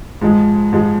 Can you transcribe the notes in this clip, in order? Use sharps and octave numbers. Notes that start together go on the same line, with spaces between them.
G#2 F3 G#3
G#2 F3 G#3